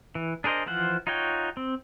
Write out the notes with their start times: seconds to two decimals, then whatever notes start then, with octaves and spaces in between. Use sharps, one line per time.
0.15 E3
0.44 D4 G#4 A#4 C5 D#5
0.66 E3 F3 F4 C5 F#5
1.07 D#4 F4 F#4 C#5 G5
1.57 C4